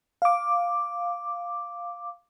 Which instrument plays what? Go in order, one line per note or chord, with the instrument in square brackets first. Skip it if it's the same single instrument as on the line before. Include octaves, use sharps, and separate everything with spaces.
[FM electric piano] F5 D6